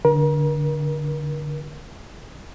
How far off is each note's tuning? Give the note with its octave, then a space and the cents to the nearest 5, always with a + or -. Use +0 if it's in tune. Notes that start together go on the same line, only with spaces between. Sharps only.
D3 +0 A#4 +35